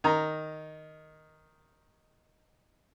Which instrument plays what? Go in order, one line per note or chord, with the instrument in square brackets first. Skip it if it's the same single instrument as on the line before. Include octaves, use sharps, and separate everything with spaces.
[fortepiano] D#3 A#5